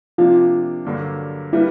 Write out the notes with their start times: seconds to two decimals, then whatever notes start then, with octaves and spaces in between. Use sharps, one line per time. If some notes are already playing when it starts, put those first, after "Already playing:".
0.18 C3 F3 A#3 D4 F4
0.85 G2 D3 F#3 A#3 D4
1.53 G3 A#3 D4 E4 G4 B4